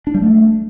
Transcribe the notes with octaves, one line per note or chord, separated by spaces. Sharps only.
D4
G3
A3